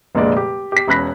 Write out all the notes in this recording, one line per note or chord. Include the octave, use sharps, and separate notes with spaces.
F1 A#2 D3 G#3 D5
G4
G4 B6
E1 C#4 B5 F#6 A#6 B6